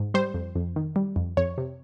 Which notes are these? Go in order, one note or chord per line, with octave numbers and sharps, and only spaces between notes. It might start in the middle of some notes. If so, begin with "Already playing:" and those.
Already playing: G#2
G3 C5
F2
F2
D#3
G3
F2
F2 C#5
C3